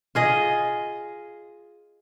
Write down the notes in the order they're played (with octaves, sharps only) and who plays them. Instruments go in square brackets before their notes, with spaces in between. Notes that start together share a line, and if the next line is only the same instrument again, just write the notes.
[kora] F4 G#4 D#5